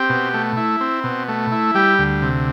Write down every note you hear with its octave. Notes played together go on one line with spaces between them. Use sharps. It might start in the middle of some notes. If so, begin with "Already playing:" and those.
Already playing: C4 G4
B2
A3
E4
C4
B2
A3
E4
G3 G4
D2
C3